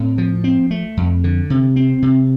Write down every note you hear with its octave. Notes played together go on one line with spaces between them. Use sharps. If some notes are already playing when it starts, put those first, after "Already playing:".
Already playing: A2 C4
F3
C4
A3
F2
D3
C3
C4
C3